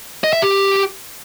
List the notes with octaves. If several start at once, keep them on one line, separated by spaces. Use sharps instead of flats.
D#5
E5
G4